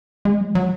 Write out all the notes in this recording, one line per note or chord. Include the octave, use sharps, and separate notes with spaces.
G#3
F#3
F#3